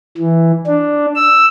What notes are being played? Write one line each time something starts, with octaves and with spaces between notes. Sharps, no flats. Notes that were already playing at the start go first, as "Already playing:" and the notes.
E3
D4
E6